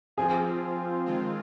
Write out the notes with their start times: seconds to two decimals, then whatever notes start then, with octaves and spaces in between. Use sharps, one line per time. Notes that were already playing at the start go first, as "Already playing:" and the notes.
0.17 F3 C4 F4 G#4
1.06 D#3 G#3 C4 F4